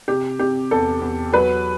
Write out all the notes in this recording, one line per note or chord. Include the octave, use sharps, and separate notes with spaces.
C3 G4
C3 G4
E2 A4
E2
F#3 B4